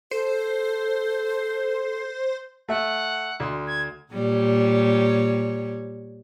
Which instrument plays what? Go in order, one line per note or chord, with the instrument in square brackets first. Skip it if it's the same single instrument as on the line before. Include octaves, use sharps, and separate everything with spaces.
[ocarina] A4 [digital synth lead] C5
[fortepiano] A3 E5 [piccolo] F#5
[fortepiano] D2 C6
[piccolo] G#6
[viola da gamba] A#2 G3 C#5